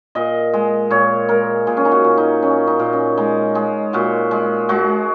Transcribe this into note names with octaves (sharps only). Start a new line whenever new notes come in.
A#2 D#5
G#3
A#2 C#5
G#3 A#4
A#2 G#4
C#4
D#4
F#4
A#2
D#4
A#2 C#4
D#4
A#2
C#4
G#3 D#4
G#3
A#2 F#4
G#3
G#3 F#4